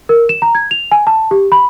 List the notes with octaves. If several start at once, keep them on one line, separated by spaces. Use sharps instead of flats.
A#4
E7
A#5
G#6
F7
G#5
A5
G4
B5